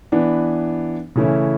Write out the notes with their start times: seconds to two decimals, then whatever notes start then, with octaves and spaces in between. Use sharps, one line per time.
0.12 E3 B3 D4
1.16 C#3 E3 A3 C#4 E4